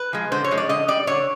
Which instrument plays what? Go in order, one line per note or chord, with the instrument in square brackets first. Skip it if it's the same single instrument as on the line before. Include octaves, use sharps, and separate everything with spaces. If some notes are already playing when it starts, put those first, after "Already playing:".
Already playing: [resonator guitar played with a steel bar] B4
F3 G#3
D3 C5
C#5
F3 G#3
D5
D3 D#5
G3 D5
D3 C#5